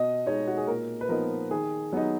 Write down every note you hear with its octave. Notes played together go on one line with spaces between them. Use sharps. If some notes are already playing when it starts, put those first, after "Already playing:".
Already playing: B2 D#5
G#3 D#4 C#5
F#4
G#4
A#2 A#4
B4
F3 B3 D#4 A#4
D#3 G#4
F#3 B3 D#4